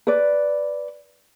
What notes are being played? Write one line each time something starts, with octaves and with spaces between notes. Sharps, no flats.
B4 D5